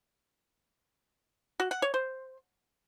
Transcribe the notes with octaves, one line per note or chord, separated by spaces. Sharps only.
F#4
F#5
C#5
C5